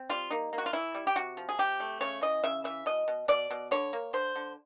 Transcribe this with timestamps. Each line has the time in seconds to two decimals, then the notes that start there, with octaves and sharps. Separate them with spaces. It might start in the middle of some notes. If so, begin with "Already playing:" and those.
Already playing: C4
0.09 G3 F4
0.30 A#3 D#4
0.53 A#3
0.58 F#4
0.66 F4
0.73 E3 E4
0.95 G3
1.07 G4
1.16 C3 F#4
1.37 F3
1.49 G#4
1.59 C3 G4
1.80 A3
2.01 C#3 C#5
2.22 E3 D#5
2.44 C#3 E5
2.64 E3 E5
2.86 B2 D#5
3.08 B2
3.28 B2 D5
3.51 B2
3.71 D3 C#5
3.93 A#3
4.13 D3 C5
4.36 D3